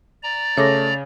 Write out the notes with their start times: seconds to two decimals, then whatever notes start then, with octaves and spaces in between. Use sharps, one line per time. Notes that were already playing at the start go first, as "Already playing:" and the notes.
0.23 D5 A#5
0.57 C#3 A3 C#5 D6 A#6